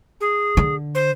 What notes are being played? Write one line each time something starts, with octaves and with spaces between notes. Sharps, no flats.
G#4
D3
C5